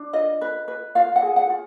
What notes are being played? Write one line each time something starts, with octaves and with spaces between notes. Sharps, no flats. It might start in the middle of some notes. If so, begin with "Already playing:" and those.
Already playing: D4
F4 D#5
B4
B4
F4 F5
F#5
G#4
F#5
F4